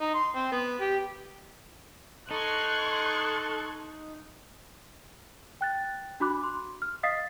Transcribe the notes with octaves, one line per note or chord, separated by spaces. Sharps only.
D#4
C6
C4
B3
G4
D#4 A4 C6 C#6 F#6 G#6
G5 F#6 A6
D4 F#4 B5 D6 F#6
C6
F6
D#5 F5 D#6 A6 B6 C7